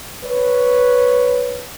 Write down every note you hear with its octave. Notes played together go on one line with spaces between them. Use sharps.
B4 C#5